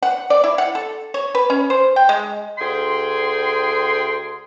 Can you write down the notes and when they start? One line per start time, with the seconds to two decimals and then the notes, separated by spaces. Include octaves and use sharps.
0.02 F#5
0.30 D5
0.44 E4
0.58 F#5
0.75 A4
1.14 C#5
1.35 B4
1.50 C#4
1.70 C5
1.96 G5
2.09 G#3
2.58 D2 G#4 G5 C6